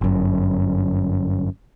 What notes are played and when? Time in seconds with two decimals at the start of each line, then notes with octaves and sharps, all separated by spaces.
0.01 G1 F#2